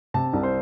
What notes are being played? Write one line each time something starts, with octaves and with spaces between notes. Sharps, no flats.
C3 A5
C2
C5